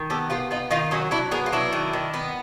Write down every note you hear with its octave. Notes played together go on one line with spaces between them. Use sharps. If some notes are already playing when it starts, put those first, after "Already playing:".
Already playing: D#3
B3 G4 A4
B3 F4 G4
B3 D#4 F4
D#3 D#4 F4
F#3 C#4 D#4
F#3 D4 E4
B3 G#4 A#4
F4
F#3 D4 E4
D#3
D#3
B3